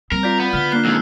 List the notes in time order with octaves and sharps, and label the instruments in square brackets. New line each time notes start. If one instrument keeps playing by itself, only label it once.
[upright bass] G3 C4 [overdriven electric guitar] A#4
[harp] F4 D5 [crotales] G6 B6
[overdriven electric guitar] B3
[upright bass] D3 [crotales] F6 B6 G7
[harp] A#3 D4 [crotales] F#6 C7 G7
[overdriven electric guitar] F2 G#2 [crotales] E6